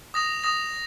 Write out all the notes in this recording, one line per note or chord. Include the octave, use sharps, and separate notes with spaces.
D#6 A#6 F7
D#6 A#6 F7